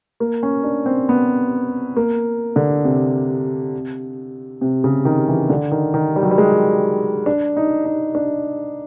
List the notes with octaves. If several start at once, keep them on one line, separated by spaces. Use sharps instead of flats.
A#3
C#4
D4
C4
B3
A#3
D3
C3
C3
C#3
D#3
E3
D3
D#3
D#3
G3
F#3
G3
G#3
D4
D#4
D#4
D4